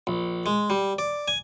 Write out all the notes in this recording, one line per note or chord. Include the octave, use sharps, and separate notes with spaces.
A#1
G#3
G3
D5
G#5